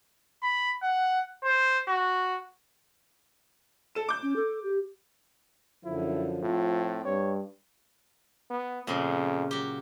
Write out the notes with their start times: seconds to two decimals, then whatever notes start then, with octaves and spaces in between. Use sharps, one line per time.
0.42 B5
0.82 F#5
1.44 C5
1.88 F#4
3.95 A4 E7
4.09 D6 G6
4.23 C#4
4.36 A4
4.64 G4
5.85 F#2 D3 F3 E4
6.42 A2 C4 F4
7.05 G2 C#5
8.50 B3
8.87 F2 A#2 C#3 G#3
9.51 F#3 G4